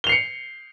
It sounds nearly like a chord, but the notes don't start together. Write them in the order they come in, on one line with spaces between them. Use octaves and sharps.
G7 F7 C7 C#7